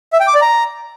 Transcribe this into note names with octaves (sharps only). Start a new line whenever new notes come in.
E5
G5
D6
D5
A#5